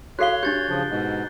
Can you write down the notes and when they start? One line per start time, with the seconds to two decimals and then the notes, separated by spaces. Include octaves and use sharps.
0.19 F#4 A4 C#5 F5 F#6 C7 G7
0.43 D4 G4 G6 A6
0.69 C#3 F3
0.90 G#2 B2